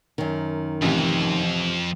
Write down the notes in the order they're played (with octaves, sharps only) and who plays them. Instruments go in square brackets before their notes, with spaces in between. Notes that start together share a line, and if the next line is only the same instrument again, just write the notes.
[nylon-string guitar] F#2 D#3
[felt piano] A1 C3 [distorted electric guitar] F2